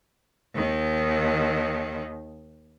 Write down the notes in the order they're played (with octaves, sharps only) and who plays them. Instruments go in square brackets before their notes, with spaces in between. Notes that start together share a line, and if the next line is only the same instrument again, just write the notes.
[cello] D#2 D#3